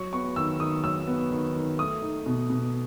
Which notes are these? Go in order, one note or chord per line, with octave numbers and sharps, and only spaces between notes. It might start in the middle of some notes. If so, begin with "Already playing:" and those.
Already playing: F#3 C#6
B3 C#6
D#3 E6
D#3 D#6
F#3 E6
B3
D#3
D#3
A3 D#6
D#4
B2
B2